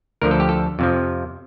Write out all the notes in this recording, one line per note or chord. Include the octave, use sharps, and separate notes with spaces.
D2 D3 F3 A#4
A4
G4
A4
F2 C3 F3